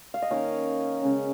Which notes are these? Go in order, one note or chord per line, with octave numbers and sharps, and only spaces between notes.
F5
D#5
D#3 A#3 C#4 A#4 C#5
C#3 G#3 C#4